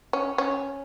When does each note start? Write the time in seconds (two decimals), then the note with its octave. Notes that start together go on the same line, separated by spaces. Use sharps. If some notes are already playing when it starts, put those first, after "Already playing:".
0.13 C#4
0.38 C#4